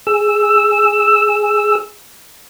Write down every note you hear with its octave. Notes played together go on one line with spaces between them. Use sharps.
G#4 E6